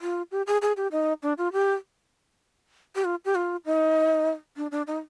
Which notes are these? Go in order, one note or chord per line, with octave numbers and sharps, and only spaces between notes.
F4
G4
G#4
G#4
G4
D#4
D4
F4
G4
G4
F4
G4
F4
D#4
D4
D4
D#4